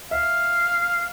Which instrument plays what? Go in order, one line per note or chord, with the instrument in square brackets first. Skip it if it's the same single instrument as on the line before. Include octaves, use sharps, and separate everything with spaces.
[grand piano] E5 [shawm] F5